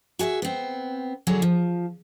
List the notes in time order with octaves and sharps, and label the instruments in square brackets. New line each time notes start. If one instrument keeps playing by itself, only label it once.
[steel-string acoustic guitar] F#4 G#4 D#5 E5
B3 C4
D3 F#3 D4 G#4
F3